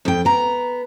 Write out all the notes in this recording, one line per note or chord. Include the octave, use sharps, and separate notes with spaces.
F2 G5
B3 A#5